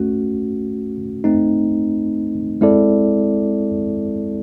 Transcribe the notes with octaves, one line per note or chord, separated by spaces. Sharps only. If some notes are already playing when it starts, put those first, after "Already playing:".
Already playing: A3 C#4 F#4
A3 C4 D#4
G#3 C4 E4 A4 D5